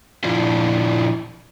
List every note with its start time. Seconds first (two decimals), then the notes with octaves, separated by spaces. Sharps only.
0.24 A#2 F3 D4 E4 F4